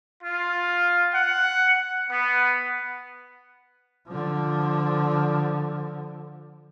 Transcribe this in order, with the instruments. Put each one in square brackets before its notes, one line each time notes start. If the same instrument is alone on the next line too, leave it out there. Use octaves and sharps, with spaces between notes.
[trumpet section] F4
F#5
B3
[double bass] D3 F3